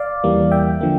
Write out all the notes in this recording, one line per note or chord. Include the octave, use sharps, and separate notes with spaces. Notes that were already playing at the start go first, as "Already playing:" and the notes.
Already playing: D5 F5
E2 E3 G3 A#3
E5 G5
D3 F3 A#3